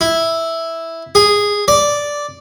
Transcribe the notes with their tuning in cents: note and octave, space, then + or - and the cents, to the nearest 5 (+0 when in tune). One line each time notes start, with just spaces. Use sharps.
E4 -5
G#4 -10
D5 -5